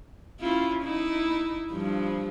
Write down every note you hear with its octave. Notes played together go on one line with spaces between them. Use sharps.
C#4 E4 F4
D#4 E4
G2 F3 G3